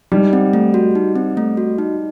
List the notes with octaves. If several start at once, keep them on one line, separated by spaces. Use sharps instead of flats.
G3 D#4
C4
A3
F#4
D#4
C4
A3
F#4
D#4